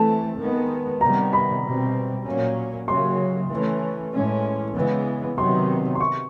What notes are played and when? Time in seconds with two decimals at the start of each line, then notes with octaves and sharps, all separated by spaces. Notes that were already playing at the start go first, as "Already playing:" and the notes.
Already playing: E3 A3 C4 A5
0.39 D#3 G#3 B3
1.01 C3 D#3 G3 B3 A#5
1.33 B5
1.64 B2 G3 C4
2.25 A#2 F#3 A#3 C#4
2.88 C#3 F#3 A#3 C6
3.50 E3 A3 C#4
4.13 A2 E3 G#3 C#4
4.75 C#3 E3 G#3 B3
5.37 C3 D#3 F#3 B3 C6
5.95 C6
6.00 C#6